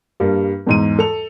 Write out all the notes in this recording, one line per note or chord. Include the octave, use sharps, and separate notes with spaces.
G2 G3 A#3
E2 G#2 D#7
A4 F7